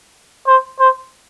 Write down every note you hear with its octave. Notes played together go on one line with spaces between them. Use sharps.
C5
C5